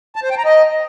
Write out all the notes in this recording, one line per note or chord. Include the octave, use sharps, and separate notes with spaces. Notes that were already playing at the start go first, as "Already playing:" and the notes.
A5
C5
G5
A#5
D#5